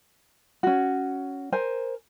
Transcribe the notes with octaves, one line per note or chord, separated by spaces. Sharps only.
C#4 F#4
A#4 C5 G#5